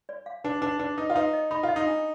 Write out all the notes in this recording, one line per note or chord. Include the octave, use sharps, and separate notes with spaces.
D5
F5
D4 B4
D4 B4
D4 B4
D#4 B4
F4
D#4 B4
D#5
D#4 B5
F4
D#5
D#4
D4